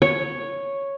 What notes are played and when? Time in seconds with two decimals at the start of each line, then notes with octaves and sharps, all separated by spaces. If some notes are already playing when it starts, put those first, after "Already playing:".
0.02 C#5